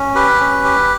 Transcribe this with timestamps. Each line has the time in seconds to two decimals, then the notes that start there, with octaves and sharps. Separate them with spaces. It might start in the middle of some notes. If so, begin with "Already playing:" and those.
Already playing: C#4
0.15 G4 B4
0.40 C#4
0.64 G4